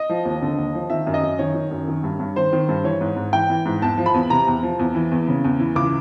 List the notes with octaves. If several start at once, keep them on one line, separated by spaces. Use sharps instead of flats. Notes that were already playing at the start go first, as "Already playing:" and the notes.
Already playing: D#5
F3
D#2
D3
D#2
F3
D#3 E5
F#2
D#5
F#2
D#3 C#5
D#3
F#2
D#3
G2
G2
D#3 C5
D#3
G2
E3 C#5
G#2
G#2
E3 G5
E3
G#2
E2 A5
F3
B5
E2
C3 A#5
E2
F3
E2
E3
E2
C#3
E2
E3
C#2 D6